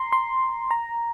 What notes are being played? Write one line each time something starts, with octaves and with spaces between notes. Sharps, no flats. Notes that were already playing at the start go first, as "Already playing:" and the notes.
Already playing: A#5 C6
C6
A#5